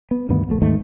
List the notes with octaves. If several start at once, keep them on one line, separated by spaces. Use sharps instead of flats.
B3
D2 G2 D#3 B3
D#1 A#1 A3
D#2 G#2 D#3 A3